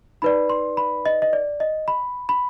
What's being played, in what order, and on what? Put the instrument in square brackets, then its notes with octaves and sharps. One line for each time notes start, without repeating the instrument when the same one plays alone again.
[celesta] D#4 B4 D5 B5
C6
B5
D#5
D#5
D5
D#5
B5
B5